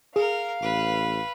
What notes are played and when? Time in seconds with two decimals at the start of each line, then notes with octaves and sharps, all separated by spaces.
0.16 G#4 A#4 F5
0.62 A1 B4